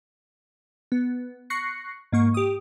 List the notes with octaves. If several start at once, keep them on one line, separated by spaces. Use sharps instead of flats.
B3
C#6 F#6 A#6 C7 C#7
G#2 A#3 C#6
G4 D#6